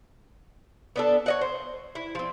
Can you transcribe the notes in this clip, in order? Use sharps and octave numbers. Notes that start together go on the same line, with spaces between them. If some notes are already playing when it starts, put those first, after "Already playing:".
B3 D4 A4
C#5 D#5 F#5
C5
E4
F3 C4